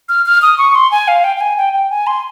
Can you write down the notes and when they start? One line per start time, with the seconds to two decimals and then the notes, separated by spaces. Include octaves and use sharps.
0.09 F6
0.26 F6
0.42 D#6
0.58 C#6
0.75 C6
0.91 G#5
1.08 F5
1.24 G5
1.37 G5
1.41 G#5
1.57 G5
1.73 G5
1.90 G#5
2.07 C6